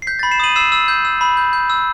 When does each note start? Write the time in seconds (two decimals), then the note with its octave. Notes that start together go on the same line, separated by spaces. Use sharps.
0.02 C7
0.07 G6 B6
0.19 A6
0.23 B5
0.31 C7 E7
0.40 D#6 D#7 F#7
0.56 E6 C7 E7
0.72 E6
0.88 G6
1.05 E6
1.21 B5
1.37 G6
1.53 G6
1.70 E6